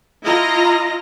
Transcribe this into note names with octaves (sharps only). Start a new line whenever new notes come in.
E4 F4 D#5 A#5